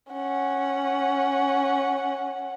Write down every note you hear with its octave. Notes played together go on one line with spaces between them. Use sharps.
C#4 F#5